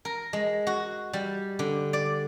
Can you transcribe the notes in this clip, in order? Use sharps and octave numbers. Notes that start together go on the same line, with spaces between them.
A#4
G#3
F#4
G3
D3
D5